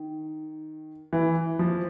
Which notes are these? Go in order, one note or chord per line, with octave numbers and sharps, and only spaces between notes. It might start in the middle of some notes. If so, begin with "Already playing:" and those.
Already playing: D#3
E3
F3